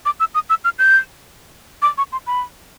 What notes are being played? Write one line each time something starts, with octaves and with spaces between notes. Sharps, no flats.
D6
E6
D#6
E6
F6
G6
D6
C#6
C6
B5